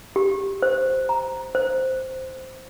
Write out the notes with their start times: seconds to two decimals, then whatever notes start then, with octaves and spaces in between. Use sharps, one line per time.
0.16 G4
0.62 C5
1.09 A#5
1.55 C5